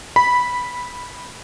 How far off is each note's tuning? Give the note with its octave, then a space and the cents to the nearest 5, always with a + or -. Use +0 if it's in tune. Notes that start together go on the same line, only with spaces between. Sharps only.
B5 -5